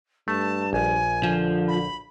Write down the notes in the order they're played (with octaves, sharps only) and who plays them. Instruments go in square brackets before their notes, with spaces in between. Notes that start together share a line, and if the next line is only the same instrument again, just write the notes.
[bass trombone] G2 [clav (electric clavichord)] A3 [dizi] A5
[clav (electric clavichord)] A#1 [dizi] G#5
[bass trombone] D3 [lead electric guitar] F3
[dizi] B5